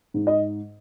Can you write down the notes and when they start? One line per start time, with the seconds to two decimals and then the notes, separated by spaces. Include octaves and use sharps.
0.14 G#2
0.27 D#5